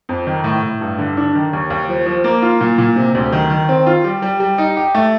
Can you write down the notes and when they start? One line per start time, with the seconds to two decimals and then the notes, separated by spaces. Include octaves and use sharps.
0.09 F2
0.27 D#3
0.44 A2
0.63 A2
0.81 G2
0.98 D3
1.17 D4
1.35 D#3
1.53 D#2
1.70 D#2
1.88 F3
2.06 F3
2.24 A#3
2.42 F4
2.61 A#2
2.78 A#2
2.96 C3
3.15 D2
3.33 D#3
3.50 D#3
3.69 C4
3.86 F4
4.04 G3
4.22 G3
4.40 G3
4.58 D#4
4.77 G4
4.95 A3